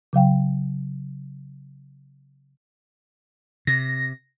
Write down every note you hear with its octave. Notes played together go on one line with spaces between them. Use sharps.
C#3 F#3 F5 G5
C3 A#6